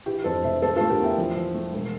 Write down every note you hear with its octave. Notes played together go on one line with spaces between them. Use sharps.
E3 G4
F2 A4 C5
F1 C5 E5
A3 A4 C5
F4 A4
A3
G4 A#4
E2 E5 G5
F3
F3
A3
E1